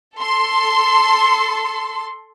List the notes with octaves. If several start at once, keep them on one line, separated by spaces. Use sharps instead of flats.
A4 C6